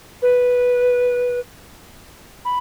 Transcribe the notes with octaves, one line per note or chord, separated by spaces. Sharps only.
B4
B5